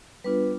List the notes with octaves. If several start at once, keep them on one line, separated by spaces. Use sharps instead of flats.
G3 B3 D4 F4 B4